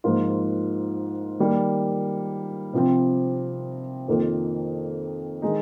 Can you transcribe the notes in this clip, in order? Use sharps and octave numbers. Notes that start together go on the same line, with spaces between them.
G#2 F3 A#3 F4
D#3 G3 A#3
C3 F3 C4
F2 D#3 A#3 F4
D#3 G#3 D#4